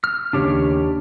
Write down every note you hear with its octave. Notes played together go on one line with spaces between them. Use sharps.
F6
D#2 G#2 C#3 D4 G4 C#5